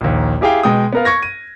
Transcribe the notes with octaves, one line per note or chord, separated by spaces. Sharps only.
A#1 D#2
E4 G4 G#4 F5 G5
B2 G#3 G5 D#6
B3 A#4 F5
C#6 G#6 A#6
D#7